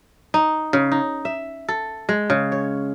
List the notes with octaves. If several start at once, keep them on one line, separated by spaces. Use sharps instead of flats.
D#4
C#3
D#4
E5
A4
G#3
C#3
C#5